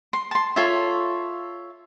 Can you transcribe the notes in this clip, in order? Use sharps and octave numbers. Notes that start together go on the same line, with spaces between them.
C6
A5 C6
F4 A4 C#5 E5